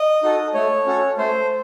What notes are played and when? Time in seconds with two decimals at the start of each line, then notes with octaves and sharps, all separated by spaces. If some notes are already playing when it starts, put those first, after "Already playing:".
Already playing: D#5
0.23 D#4 F#4 A4
0.54 A3 C#5
0.86 C#4 F#4 A4
1.18 A3 C5